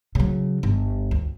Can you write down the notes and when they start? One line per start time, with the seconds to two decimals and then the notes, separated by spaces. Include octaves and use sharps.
0.15 C#3 F#3
0.63 G1
1.11 D2